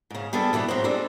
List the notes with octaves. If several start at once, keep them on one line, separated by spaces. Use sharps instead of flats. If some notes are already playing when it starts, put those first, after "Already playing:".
G#2 C#3
G3 B3 D4 G#4 A4
B2 E3 G3 B3
G#2 F#3 C4
G3 G#3 C4 D4 A4